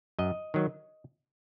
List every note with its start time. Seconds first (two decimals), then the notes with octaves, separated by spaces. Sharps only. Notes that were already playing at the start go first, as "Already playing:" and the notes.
0.19 F#2 D#5
0.54 D#3 F#3